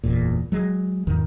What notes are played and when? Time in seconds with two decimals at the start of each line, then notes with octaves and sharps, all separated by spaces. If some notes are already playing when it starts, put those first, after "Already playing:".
0.04 F#1 E2 A#2
0.52 F#3 G#3
1.07 E2 G#2 D#3